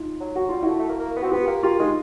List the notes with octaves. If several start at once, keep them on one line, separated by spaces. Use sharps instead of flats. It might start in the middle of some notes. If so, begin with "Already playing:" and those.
Already playing: D#4 F4
F#3
F#3 F#4
G3 F4
A3 E4 F#4
A3
A#3
A#3
B3
C4 F#4
B3 F4 G4
A#3
A#3 F4 G4
G#3 D#4 F4